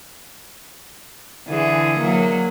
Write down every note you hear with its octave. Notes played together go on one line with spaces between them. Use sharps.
D3 E3 G#4
F#3 A#3